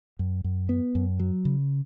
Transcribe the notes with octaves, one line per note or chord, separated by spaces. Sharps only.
F#2
F#2
B3
F#2
F#3
C#3